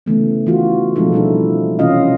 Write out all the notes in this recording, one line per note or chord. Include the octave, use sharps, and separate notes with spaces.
C#3 E3 A3 B3
E3 F4 F#4
B2 F3 G#3 C4 D#4 A4
G3 D4 E4 A4
C3 E3 C#4 F4 D#5 F5